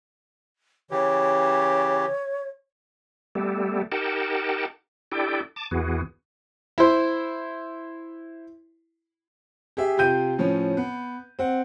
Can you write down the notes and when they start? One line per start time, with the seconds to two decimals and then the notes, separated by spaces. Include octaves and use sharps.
0.91 C#3 E3 G4 C#5
3.35 G3 A3 B3 G4 A4
3.92 D#4 G4 A#4 F#5 G5 A5
5.12 D4 E4 G4 A4 D5 G5
5.56 A5 D6
5.71 E2 E3 B3 F#4 G#4
6.78 E4 C5
9.77 G4 G#4 E5
9.97 C3 F4 G5 G6 D#7
10.38 A2 F3 C#4
10.77 B3
11.39 C4 F#5